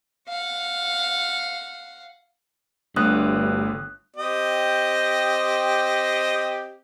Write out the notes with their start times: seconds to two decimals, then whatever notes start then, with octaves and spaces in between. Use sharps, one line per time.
0.28 F5 F#5
2.96 G1 G2 D3 A3 D#6 F#6
4.16 C4 G4 D#5